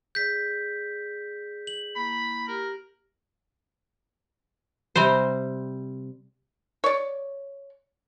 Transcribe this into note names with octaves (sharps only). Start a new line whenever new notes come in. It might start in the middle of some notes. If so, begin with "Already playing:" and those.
G#4 D5 G6 B6
F#7
A#3 E4 B5
G4 A#4
C3 G3 C4 C5
C#5 D5